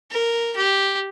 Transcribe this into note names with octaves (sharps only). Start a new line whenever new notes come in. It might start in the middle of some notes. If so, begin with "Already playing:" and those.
A#4
G4